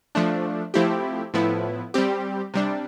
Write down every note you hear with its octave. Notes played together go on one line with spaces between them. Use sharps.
F3 A3 D4
F3 A3 C4 E4 G4
A2 F3 B3 E4
G3 C4 G4
C3 G3 D4